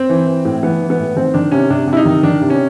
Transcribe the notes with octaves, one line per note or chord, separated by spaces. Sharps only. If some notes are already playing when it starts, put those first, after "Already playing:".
Already playing: C4
E3
E3
A2
E3 B3
E3
B3
A2
D#3 C4
D#3 D4
C3 C#4
C3 D4
C3
E4
D#4
D#3
D#3 D4
C3
C#4